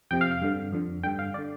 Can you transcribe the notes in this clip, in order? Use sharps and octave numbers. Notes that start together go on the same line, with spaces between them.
F2 C3 G5
F5
F5
G2 D3
F2 D3
G2 D3 G5
F5
D5
D3